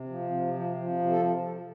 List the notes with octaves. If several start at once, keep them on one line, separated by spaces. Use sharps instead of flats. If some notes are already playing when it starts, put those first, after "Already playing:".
Already playing: C3
F3
C3
F3
F3
C3
A4